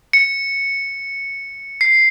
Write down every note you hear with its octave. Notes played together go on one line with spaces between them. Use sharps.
C#7
C7